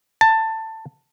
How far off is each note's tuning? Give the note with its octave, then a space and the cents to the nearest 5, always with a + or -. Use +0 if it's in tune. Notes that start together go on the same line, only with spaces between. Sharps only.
A5 +15